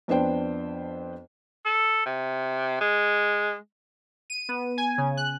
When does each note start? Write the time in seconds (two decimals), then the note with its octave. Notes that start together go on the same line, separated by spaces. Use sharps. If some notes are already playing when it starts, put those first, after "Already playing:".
0.08 F2 B3 D4 C5 G5
1.65 A4
2.06 C3
2.81 G#3
4.30 D#7
4.49 B3
4.78 G#5
4.98 C#3
5.17 F#6